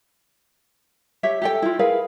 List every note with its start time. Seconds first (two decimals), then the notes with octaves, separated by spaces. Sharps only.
1.23 G4 C#5 E5
1.42 G4 A4 G5
1.62 E4 F4
1.79 G#4 A#4 B4 F5